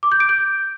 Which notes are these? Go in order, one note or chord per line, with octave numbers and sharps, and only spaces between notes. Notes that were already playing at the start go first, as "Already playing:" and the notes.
D6
G6
D7
G6